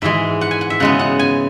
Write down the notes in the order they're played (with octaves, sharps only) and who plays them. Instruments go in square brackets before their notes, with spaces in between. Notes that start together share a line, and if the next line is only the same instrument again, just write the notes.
[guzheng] G#2 E3 G#3 E5
F#5
G#5
F#5
E5
C#3 G#3 B3 F#5
F#5
G#5